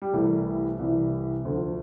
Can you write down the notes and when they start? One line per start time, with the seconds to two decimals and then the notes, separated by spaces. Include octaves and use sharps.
0.02 G3
0.13 C2 C3 E3 A3
0.79 C2 C3 E3
1.45 D2 D3 F3